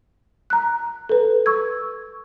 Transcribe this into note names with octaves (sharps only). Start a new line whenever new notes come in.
A#5 F#6
A4 B4
C#6 E6 G#6